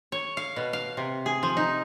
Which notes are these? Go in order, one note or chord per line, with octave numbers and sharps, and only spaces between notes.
C#5
F5
B2
F5
C3
G#4
F3
D#4